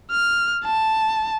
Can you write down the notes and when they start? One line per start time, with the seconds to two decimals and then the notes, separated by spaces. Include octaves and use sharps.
0.11 F6
0.65 A5